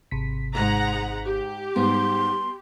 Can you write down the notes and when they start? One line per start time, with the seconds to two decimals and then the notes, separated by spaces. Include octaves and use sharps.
0.11 G#1 C3 B6
0.55 E2 G#2 G#3 F#5 A#5
1.25 G4
1.76 G#2 G3 B3 C6